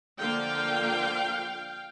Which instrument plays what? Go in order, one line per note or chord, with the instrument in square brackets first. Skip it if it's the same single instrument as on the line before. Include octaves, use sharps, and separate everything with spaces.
[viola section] D3 F3 A#3 F5 G5